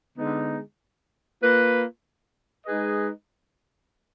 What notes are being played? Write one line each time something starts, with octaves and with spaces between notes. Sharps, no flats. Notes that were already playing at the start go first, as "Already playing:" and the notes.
D3 G#3 B3 D#4
A#3 F4 B4
G#3 D#4 G#4 B4 D#5